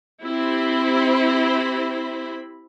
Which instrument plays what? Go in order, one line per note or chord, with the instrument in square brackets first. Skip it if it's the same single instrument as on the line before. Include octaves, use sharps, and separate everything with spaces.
[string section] C4 E4 G4 C5 B5